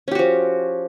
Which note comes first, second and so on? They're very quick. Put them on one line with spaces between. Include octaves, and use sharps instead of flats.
C#4 G4 F#4 F3